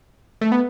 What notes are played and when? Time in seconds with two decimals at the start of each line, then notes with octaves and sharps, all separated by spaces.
0.41 A3
0.52 B3